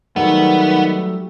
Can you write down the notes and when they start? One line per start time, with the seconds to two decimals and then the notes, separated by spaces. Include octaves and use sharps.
0.16 D#3 F#3 G3 A3 B3